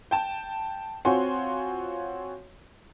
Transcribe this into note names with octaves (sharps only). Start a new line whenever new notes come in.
G5 A5
C4 F4 F#4 C#5 G#5 C6